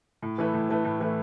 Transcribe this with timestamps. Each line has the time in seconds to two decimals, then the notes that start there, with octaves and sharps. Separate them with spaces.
0.22 A2
0.38 E3 A3 E4 B4
0.54 A2
0.69 E3 A3 E4 B4
0.84 A2
1.00 E3 A3 E4 B4